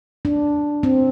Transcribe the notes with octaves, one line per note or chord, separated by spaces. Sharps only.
D4
C4